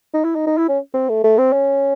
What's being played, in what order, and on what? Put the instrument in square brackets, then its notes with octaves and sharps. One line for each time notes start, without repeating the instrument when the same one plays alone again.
[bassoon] D#4
E4
D#4
D#4
E4
C#4
C4
A3
A3
C4
C#4